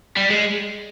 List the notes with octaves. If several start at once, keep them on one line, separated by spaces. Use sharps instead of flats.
G3
G#3